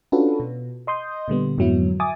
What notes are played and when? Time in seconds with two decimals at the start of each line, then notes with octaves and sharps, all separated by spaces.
0.12 C#4 D4 F4 F#4 A4 B4
0.40 B2
0.87 D#5 C6 D#6 G6
1.28 A#2 D3 G3 B3
1.58 F2 G#2 D3 F#3 B3 E4
2.00 E5 G#5 D6 D#6 A6